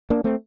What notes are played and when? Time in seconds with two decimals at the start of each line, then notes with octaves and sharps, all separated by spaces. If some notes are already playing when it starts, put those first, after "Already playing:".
0.10 A#3 D4
0.24 A3 C4